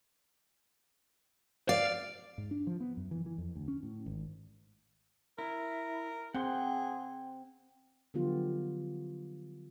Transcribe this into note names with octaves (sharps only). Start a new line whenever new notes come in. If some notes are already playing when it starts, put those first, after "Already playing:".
D5 F5
G#2
D4
F3
B3
F#2
E3
E3
F2
D2
C#4
A2
G#1
E4 A#4
C4 G#4 F#5 G5 C6
D3 F3 F#3 B3 F4 G4